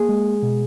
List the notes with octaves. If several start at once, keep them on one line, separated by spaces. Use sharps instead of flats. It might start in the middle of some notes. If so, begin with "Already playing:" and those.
Already playing: A#3 G#4
G#3
B2